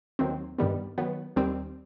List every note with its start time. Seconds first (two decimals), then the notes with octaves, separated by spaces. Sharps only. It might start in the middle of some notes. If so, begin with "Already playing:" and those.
0.19 D#2 D#3 F#3 C4
0.58 G2 D#3 G3 B3
0.98 D#3 F#3 B3
1.36 D#2 D#3 G3 C4